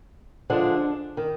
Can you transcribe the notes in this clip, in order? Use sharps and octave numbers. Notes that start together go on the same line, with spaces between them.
D3 F3 G#3 D4
D#3